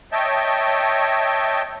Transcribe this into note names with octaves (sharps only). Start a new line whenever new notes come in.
C#5 D#5 E5 G5 A5